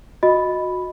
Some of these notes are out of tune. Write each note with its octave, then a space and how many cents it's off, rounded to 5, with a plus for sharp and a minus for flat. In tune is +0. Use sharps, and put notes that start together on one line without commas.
F#4 -20 D#5 +0 B5 +0